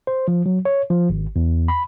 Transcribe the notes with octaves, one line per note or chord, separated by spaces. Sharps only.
C5
F3
F#3
C#5
F3
G#1
E2
B5